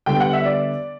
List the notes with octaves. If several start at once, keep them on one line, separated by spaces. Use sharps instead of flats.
D3 G3 B3 G5
F#5
E5
D5